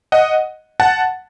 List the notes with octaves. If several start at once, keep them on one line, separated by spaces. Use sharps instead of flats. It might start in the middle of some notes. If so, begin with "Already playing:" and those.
D#5 F#5
F#5 A5